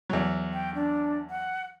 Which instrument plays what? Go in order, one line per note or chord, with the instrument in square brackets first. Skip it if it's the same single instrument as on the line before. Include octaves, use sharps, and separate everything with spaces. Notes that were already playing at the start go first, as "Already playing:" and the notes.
[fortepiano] E2 F#3
[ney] G5
D4
F#5